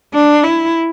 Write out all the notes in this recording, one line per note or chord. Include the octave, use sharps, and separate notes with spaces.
D4
E4